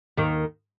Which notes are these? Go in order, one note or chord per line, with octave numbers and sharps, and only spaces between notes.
D#2 D#3